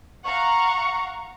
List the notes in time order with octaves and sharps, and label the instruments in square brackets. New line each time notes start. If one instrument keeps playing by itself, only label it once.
[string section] F5 F#5 A#5 [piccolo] C#6